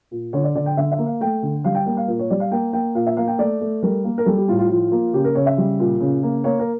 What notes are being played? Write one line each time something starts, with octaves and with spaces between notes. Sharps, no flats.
A#2
D3 C#5
D5
D3 D5
G5
D3 E5
E5
A#3
F5
A3 G5
D3
G3 F5
G5
A#3 G5
F5
A#2 A#4
C#5
G3 D5
F5
A#3 G5
A#3 G5
A#2 F5
E5
A#3 F5
G5
A3 D5
A3
G3 A#4
A#3
A#4
G3 A4
G4
A2 F4
F4
F3 F4
A#3 F4
C#3 G4
A#4
C#3 C#5
E5
G3
A#2
C#3
A#3
A#3 C#5
A#4